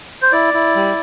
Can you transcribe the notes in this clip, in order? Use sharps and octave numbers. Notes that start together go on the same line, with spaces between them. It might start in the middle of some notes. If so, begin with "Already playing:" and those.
C5
E4 D5
E4
G3